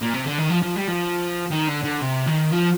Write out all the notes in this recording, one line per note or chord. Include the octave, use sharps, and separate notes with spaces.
A#2
C3
D3
D#3
F3
F3
G3
F3
D#3
D3
D3
C3
D#3
F3